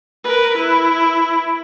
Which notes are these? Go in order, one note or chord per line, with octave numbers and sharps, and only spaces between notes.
A#4 B4
E4